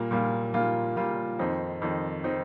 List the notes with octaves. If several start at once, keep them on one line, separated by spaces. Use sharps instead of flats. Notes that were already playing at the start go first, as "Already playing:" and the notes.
Already playing: A#2 G3 A#3 F4
A#2 G3 A#3 F4
A#2 G3 A#3 F4
A#2 G3 A#3 F4
F2 D#3 C4 D#4
F2 D#3 C4 D#4
D#3 C4 D#4